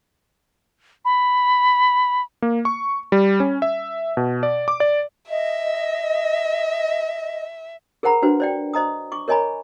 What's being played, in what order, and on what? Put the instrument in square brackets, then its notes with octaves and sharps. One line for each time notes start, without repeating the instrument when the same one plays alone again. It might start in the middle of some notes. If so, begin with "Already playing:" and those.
[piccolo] B5
[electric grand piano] A#3
C#6
G3
C#4
E5
B2
D5
D6
D5
[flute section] D#5 [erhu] E5
[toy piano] G#4 A#4 C5 F#5 A#5 B5
D4 F#4 B4 C5
C5 D5 G5
C5 D#5 A#5 D#6
C#6 D6
A#4 C#5 D#5 G#5 A#5 B5